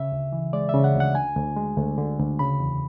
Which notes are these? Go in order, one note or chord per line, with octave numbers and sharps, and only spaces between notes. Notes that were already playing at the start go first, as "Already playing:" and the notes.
Already playing: C#3 E5
D2
E3
G#3 D5
E5
C#3
F#5
D2
F#5
D3 G#5
D2
G#3
D2
D3
D2
C#3 B5
E2